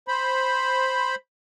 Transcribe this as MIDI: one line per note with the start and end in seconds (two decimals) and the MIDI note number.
0.08 1.15 72
0.08 1.15 83